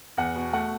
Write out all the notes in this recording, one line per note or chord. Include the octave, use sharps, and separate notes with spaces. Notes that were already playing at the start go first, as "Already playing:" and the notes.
E2 F#5
B2
A3 F#5